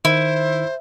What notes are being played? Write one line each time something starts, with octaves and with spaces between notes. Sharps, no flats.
D#3 E4 C5